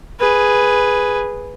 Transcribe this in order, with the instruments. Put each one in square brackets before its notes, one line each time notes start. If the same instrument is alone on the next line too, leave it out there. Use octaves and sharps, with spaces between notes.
[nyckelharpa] G#4 B4